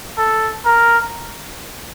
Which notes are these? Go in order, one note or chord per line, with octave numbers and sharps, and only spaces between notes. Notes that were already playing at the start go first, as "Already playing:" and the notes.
A4
A#4